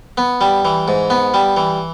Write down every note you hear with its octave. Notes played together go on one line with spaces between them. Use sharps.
B3
G3
E3
G#2
B3
G3
E3